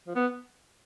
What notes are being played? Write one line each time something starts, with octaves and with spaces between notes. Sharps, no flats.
F3
B3